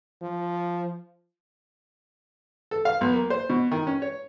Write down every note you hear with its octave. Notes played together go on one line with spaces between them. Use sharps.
F3
A4
F5
B1
A#3
C5
B2
D#3
C#4
C#5